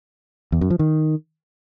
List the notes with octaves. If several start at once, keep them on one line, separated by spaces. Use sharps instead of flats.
E2
F#2
F3
D#3